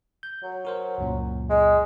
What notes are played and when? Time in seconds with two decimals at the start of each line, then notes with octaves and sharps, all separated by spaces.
0.23 G6
0.43 F#3
0.65 F#4 A#4 C5
0.98 C#2 F#2 A#2
1.49 G#3